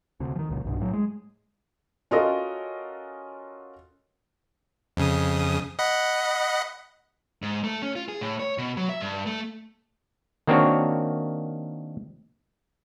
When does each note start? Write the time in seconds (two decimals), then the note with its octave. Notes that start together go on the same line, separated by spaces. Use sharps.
0.20 D2 C3
0.36 D#3 F3
0.49 D1 C#2 A#2
0.65 B1 G2 B2
0.80 A2 F#3
0.93 G#3
2.11 C#4 F4 F#4 A4 A#4 D#5
4.97 F2 C#3 D#6
5.79 D#5 F#5 B5
7.42 G#2
7.64 A3
7.82 C#4
7.95 F4
8.08 G#4
8.21 A2
8.40 C#5
8.58 B2
8.77 F#3
8.89 E5
9.01 G2
9.26 A3
10.47 D#3 A#3 C4 D4 F#4 C#5